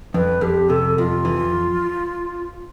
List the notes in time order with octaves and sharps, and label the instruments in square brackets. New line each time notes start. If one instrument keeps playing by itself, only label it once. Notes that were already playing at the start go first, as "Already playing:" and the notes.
[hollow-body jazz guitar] F2 [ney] B4
[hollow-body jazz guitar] F2 [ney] G4
[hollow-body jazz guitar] C3 [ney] A4
[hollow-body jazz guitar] F2 [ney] F4
[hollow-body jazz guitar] E3